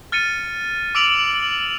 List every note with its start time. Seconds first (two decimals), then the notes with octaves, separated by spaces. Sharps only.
0.12 F6 A6 C#7 D#7
0.95 D6 E6 D7 F7 F#7